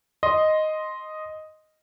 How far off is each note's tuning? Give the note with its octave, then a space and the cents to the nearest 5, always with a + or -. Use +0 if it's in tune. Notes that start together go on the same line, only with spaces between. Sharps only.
D#5 +0 C6 +0